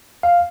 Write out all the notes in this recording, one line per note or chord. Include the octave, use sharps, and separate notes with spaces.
F5